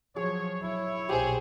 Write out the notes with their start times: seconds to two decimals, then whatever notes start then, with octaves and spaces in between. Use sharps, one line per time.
0.16 F3 F#3 G#4 C#5
0.63 E4 C#5
1.09 B1 A#2 G4 G#4 C5